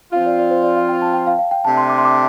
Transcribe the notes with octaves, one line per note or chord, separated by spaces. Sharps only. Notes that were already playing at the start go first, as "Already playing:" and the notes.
F3 C4 F4 F5
D5
D5
C5
D5
F5
G5
A5
G5
F5
F5
G5
C3 A3 D4 A5
C6
D6
C6
D6